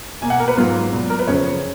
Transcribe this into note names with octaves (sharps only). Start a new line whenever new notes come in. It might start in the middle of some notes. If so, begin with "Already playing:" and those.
B2 A#3 G#5
F#5
A#4
B4
G#2 F#3 A#3 F4
A#2 F#3 B3
A#4
B4
F#2 C#3 F3 C#5